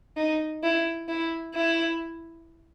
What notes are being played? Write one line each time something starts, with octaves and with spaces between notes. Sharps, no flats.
D#4
E4
E4
E4